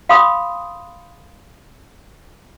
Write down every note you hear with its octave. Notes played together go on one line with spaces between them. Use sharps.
F5 G5 B5 C6 D#6